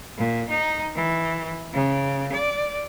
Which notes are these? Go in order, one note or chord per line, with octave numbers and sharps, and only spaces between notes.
A#2
D#4
E3
C#3
D5